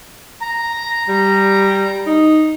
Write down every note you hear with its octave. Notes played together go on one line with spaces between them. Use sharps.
A#5
G3
D#4